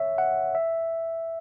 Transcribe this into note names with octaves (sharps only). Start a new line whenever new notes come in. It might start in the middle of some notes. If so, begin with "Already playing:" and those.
Already playing: C#5 E5
F#5
E5